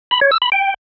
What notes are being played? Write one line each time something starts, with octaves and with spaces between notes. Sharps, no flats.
B5
C#5
E6
B5
G5